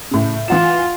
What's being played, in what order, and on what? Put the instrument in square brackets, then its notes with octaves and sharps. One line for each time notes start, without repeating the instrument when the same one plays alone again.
[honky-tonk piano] A2 C#3
[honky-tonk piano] E3 F#5 E7 [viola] F4